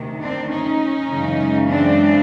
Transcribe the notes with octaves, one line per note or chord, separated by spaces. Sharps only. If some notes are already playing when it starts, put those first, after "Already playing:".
Already playing: D2 C3 D#3
C4 D4
C#4 D#4
F#2 C#3 E3 G#3
C4 D4